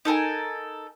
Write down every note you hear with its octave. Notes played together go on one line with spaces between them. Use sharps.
D#4 A4 A#4 G#5